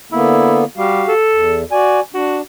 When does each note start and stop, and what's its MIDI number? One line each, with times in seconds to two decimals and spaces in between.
0.12 0.65 50
0.12 0.65 58
0.12 0.65 59
0.12 0.62 64
0.78 1.03 55
0.78 1.13 66
0.78 1.13 67
0.78 1.13 77
1.08 1.63 69
1.31 1.64 40
1.71 2.00 66
1.71 2.00 74
1.71 2.01 80
2.14 2.42 62
2.14 2.39 66